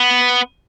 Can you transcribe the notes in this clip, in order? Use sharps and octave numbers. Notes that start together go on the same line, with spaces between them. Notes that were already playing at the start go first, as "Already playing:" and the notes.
Already playing: B3